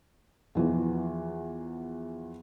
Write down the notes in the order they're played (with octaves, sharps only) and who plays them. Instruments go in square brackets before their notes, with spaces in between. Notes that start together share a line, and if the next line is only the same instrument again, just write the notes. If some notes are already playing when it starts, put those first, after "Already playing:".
[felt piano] E2 E3 F3